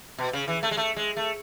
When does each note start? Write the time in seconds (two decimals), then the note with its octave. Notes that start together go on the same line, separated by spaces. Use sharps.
0.18 B2
0.33 C#3
0.48 E3
0.63 A3
0.71 G#3
0.77 A3
0.96 G#3
1.17 A3